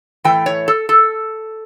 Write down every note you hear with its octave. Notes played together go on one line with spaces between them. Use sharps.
A2 E3 A3 G5
C#5
A4
A4